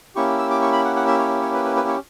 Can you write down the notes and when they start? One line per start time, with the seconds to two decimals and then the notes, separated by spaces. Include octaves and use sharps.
0.15 A#3 C#4 E4 G4 C#6
0.39 E6
0.50 D6
0.62 C#6
0.73 B5
0.85 F#5
0.96 F#5
1.08 E5
1.19 C#5
1.42 C#5
1.54 B4
1.65 B4
1.76 B4
1.88 C#5